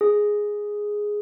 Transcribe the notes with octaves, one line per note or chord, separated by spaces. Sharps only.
G#4